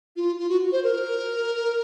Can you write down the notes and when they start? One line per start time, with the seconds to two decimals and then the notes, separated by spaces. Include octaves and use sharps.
0.16 F4
0.39 F4
0.49 F#4
0.72 C5
0.84 A#4